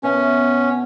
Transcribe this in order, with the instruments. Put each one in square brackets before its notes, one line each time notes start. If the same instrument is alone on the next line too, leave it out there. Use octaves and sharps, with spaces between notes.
[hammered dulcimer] B2 E5 [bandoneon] C#4